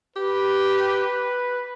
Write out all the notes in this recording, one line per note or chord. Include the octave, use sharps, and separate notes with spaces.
G4 B4